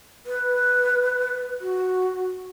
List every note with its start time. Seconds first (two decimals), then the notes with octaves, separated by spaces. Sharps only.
0.26 B4
1.61 F#4